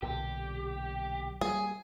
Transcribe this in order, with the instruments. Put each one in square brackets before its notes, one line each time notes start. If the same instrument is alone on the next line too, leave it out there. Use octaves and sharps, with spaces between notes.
[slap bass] B1 A#2 D3 [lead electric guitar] G4
[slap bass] G3 A#3 [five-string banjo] G#4